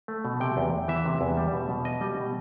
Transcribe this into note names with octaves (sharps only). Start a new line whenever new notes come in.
A3
B2
C3 G5
E2
E2
E3 E5
C3
E2
G3
B2
B2
B3 D#5
G3
B2